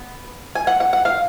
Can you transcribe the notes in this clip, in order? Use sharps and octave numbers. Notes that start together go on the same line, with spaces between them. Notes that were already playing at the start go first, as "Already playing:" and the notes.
Already playing: B3
G#5
F#5
F#5
F#5
F5